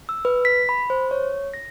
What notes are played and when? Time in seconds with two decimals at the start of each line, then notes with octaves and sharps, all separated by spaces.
0.09 E6
0.25 B4
0.45 B6
0.69 B5
0.90 C5
1.11 C#5
1.54 A#6